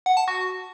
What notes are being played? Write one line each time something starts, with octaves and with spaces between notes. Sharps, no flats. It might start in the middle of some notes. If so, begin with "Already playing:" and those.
F#5
A5
F#4